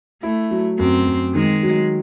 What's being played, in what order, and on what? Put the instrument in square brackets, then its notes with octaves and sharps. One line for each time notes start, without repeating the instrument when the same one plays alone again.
[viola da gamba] A3 [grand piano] E4
[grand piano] F#3
[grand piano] F#2 [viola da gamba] C4
[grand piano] F#2
[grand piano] D#3 [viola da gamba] G#3
[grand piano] F#3